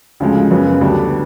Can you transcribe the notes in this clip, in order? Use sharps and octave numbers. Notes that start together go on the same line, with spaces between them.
D2 C#3 F3 G#3
F#2 C#3 F#3 B3
D2 D3 G3 B3 D4